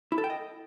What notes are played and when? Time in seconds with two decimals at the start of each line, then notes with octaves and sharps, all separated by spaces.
0.12 E4
0.18 A4
0.24 G5
0.30 D#5